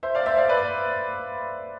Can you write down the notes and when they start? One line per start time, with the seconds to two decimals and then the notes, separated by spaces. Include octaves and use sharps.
0.03 C5 E5
0.15 D5 F5
0.26 C5 E5
0.37 D5 F5
0.49 B4 D5